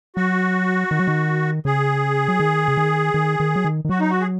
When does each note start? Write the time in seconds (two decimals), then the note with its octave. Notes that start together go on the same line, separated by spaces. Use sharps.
0.16 F#3 F#4
0.91 D#3
0.99 F#3
1.07 D#3
1.65 C#3 G#4
2.28 F#3
2.40 D#3
2.68 C#3
2.77 D#3
3.14 D#3
3.40 D#3
3.56 F#3
3.64 D#3
3.85 D#3
3.89 F#3 F#4
4.00 D#4
4.10 F#4
4.21 G#4